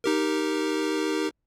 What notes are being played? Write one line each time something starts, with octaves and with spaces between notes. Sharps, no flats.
D#4 G4 A#4